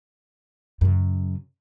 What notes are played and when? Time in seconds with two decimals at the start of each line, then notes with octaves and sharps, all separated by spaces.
0.81 F#2 C#3